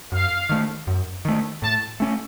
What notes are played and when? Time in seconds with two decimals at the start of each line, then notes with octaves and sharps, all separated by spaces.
0.12 F#2 F5
0.49 D#3 A3
0.87 F#2
1.25 D#3 A3
1.62 A2 A5
2.00 A3 C#4